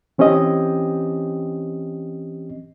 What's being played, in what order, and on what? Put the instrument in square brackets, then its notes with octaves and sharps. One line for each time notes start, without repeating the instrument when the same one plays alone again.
[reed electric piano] E3 C4 C#4 G4 D#5